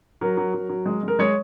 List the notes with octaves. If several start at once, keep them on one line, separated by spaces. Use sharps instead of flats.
F#3 A#4
F#3
F#3
F#3
G#3
G#3 A#4
G#3 C#5